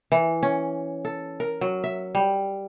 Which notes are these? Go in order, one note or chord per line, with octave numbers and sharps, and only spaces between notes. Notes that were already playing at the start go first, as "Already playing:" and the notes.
E3
C#4
A4
A#4
F#3
E5
G3